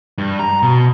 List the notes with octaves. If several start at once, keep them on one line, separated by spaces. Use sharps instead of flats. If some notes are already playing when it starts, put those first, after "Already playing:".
G2
A#5
B2